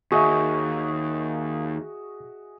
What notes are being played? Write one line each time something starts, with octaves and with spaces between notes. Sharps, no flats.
D#2 F#4 G#4 D#5 E5 C#6